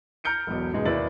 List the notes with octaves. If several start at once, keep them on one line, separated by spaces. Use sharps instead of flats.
A#5 F6 G6 C#7 D7
E1 B1
C#2 B2 G#3
D#2 E4 B4 D5 A6 F#7